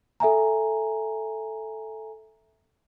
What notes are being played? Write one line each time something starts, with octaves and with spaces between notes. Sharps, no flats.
A4 E5 G#5 A#5